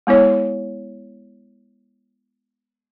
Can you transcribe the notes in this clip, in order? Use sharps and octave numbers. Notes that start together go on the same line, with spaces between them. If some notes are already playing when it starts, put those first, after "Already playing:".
G#3 B3 E4 C#5